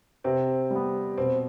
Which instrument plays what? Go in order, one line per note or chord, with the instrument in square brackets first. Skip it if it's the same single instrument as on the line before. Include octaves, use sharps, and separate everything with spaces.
[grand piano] C3 [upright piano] C4
[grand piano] G3 B3
[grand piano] B2 [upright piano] C4